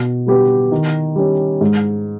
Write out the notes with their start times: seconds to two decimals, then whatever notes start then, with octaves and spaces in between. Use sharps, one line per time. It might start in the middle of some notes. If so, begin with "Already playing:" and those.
Already playing: B2
0.26 G3 B3 G4 B4
0.72 D#3
1.16 G3 C#4
1.61 G#2